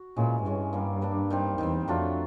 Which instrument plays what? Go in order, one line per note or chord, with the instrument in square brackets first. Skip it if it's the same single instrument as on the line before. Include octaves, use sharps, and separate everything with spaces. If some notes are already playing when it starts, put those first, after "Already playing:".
Already playing: [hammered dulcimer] F#4
[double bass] A#2 [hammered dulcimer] E3 G#3 C#4
[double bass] G2 [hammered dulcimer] E3 G#3 C#4
[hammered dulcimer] G3 A#3 D4
G3 A#3 D4
D#3 G3 C4
[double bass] E2 [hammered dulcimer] D#3 G3 C4
[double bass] F2 [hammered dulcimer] F#3 A3 D4 F4